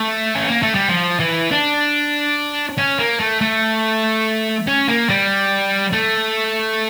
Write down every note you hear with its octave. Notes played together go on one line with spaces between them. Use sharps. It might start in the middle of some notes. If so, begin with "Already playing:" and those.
Already playing: A3
C#4
A#3
A3
G3
F3
E3
D4
C#4
A#3
A3
A3
C#4
A#3
G3
A3